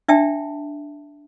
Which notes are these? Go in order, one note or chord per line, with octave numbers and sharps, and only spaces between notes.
D4 E5 G5 A5